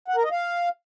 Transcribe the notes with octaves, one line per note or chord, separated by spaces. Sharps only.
F#5
A#4
D#5
F5